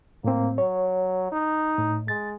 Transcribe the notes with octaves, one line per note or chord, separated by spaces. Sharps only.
A2 A#3 C4
F#3 C#5
D#4
A2
G#3 A6